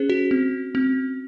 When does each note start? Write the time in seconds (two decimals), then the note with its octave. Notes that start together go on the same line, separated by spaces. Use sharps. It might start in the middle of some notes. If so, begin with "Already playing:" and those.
Already playing: C#4 G#4 C5
0.10 F#4
0.31 C4
0.75 C4